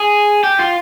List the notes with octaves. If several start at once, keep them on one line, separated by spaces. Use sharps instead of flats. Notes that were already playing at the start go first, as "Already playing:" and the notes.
Already playing: G#4
G4
F4